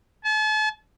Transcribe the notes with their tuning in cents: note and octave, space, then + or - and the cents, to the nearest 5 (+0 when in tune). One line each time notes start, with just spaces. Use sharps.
A5 -40